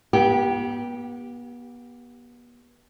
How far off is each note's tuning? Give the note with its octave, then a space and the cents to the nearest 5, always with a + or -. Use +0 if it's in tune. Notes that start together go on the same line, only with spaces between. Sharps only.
B3 -35 G4 +0